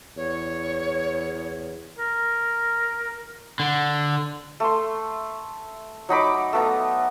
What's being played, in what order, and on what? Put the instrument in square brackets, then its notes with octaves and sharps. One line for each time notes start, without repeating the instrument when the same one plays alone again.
[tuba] E2 [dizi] C#5
[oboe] A#4
[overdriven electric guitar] D3
[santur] A3 C6
F#3 D#4 B5 D6
A3 B3 A#5